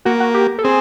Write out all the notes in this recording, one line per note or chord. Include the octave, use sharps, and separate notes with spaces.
A#3 F#4
F#4
G4
A4
C4 G#4